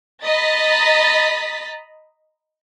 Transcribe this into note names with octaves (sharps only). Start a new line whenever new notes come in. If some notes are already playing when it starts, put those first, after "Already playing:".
D#5 A#5 B5 A6 B6